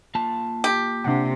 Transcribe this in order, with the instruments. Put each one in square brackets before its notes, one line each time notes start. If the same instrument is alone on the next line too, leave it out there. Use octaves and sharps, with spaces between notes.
[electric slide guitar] A#3 F4 A5
[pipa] G4
[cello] C3 [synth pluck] D4 F#5